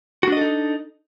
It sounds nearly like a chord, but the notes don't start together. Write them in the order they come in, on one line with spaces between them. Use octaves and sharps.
F#4 D4 D#5 A4 D#4